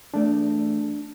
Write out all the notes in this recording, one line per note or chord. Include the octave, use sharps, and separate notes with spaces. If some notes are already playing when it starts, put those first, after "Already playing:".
E2 A3 D4 D5